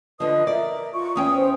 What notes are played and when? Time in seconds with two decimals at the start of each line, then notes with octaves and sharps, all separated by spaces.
0.20 D3 F3 B4 D#5 D#6
0.47 A#4 D5 E5
0.94 F4 C#6
1.16 E2 C#4 G5 D#6
1.36 C5